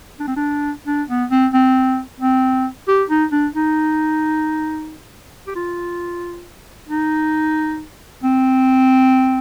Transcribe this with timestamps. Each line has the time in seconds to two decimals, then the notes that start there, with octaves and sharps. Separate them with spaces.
0.20 D4
0.28 C4
0.36 D4
0.87 D4
1.09 B3
1.31 C4
1.53 C4
2.20 C4
2.88 G4
3.09 D#4
3.32 D4
3.55 D#4
5.47 G4
5.56 F4
6.89 D#4
8.23 C4